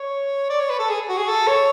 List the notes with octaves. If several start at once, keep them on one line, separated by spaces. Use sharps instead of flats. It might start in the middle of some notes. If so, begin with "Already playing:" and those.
Already playing: C#5
D5
C#5
B4
A4
G#4
F#4
G#4
A4
C#5